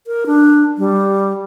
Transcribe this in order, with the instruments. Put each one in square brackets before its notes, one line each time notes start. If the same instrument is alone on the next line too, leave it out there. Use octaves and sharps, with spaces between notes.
[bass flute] A#4
D4
G3